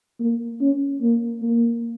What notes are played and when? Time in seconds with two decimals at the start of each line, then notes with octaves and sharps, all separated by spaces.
0.20 A#3
0.61 C#4
1.02 A#3
1.42 A#3